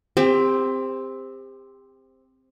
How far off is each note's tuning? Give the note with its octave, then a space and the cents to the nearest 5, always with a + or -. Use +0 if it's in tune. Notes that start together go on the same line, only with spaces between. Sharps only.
C4 +0 G4 +35